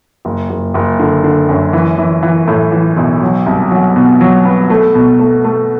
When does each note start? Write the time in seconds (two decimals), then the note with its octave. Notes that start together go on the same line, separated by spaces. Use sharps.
0.25 F#1
0.50 F#1
0.74 F#1
0.99 D3
1.24 D3
1.49 F#2
1.73 E3
1.98 E3
2.23 E3
2.48 A2
2.72 E3
2.97 B1
3.22 F#3
3.46 C2
3.71 F#3
3.96 B2
4.21 F#3
4.45 B3
4.70 A3
4.95 B2
5.20 A3
5.44 A3